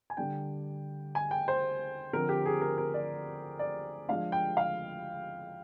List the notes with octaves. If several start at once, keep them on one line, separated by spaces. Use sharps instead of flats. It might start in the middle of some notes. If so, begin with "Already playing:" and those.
G#5
D3 G3 D4 G5
G#5
G5
C5
D3 F3 C4 A#4
G4
G#4
A#4
A#4
D5
D5
F3 G#3 D4 F5
G5
F5